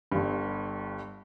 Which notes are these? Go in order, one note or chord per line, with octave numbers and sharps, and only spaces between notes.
G1 G2